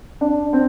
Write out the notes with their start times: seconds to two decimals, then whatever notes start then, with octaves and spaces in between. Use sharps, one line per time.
0.21 D4
0.53 C4